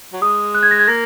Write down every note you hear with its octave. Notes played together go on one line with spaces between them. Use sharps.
F#3
G#3 D#6
F#6
G#6
A#6
G#6
A#3 A#6